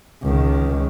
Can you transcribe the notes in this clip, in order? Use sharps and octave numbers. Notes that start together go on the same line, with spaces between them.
C#2 D#3